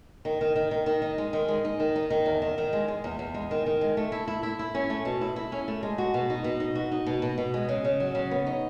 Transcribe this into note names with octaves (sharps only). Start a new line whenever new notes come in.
D#3
D#3
D#3
D#3
D#3
D#4
G#3
D#3
G#3
D#4
D#3
D#4
D#3
E2
D#3
D#3
G#3
G#3
E2
E2
G#3
D#3
D#3
G#3
A3
E4
E4
E4
E4
C#4
A3
B2
E4
E4
C#4
A3
G#3
F#4
B2
D#4
B2
D#4
F#4
D#4
B2
B2
B2
G#3
C#3
C#3
F#3
C#3
B3
D#4